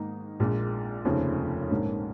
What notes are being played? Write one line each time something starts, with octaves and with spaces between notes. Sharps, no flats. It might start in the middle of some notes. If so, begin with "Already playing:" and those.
Already playing: G#2 D#3 A#3 D#4
A#1 A#2 G#3
F1 D#2 C#3 F3
A#1 G#2 F3 C#4 A#4